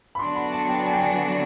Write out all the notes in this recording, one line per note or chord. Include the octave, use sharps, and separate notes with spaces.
B5
D3 F#3 B3 D4 F#4 C6
B5
A5
G5
G#5
G5
G#5